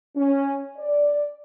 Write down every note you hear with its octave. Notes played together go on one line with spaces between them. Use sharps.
C#4
D5